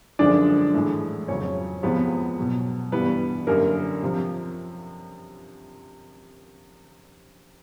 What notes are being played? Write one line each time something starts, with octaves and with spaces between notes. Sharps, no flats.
F#2 D3 F3 G#3 D4 D5
A2 E3 G#3
F2 C#3 F#3 C#4 C#5
E2 C3 F3 G#3 B3 B4
B2 F#3
G2 E3 G3 B3 B4
F#2 D3 G3 A#3 A#4
C3 F3